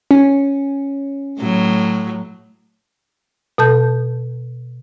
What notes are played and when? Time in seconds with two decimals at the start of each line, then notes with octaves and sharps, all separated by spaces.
0.11 C#4
1.38 A2 F#3
3.58 B2 A4 A5 G6